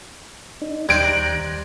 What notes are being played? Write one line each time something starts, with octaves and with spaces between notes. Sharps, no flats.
D4 D#4
D#2 G3 C5 A#5 F#6 G#6 D7